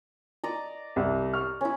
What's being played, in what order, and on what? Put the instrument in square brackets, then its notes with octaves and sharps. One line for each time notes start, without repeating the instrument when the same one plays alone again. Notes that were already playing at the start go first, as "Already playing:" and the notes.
[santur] D5 D#5 A#5
[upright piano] C2
C#6 F6
[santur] C#4 E4